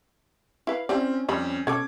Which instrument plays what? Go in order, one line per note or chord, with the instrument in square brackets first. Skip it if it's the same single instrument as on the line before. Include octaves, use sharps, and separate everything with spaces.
[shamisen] E4 B4 [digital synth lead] F5
[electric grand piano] C4 [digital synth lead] C#4 [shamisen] E4 G4 D5
[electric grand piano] F2 [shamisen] G3 B5 [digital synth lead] C#4
[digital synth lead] B2 [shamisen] C#4 A4 [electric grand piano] D6 G#6